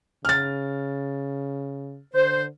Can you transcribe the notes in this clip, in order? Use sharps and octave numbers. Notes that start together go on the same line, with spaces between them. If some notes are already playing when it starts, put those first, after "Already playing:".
C#3 F6 A6
D3 C5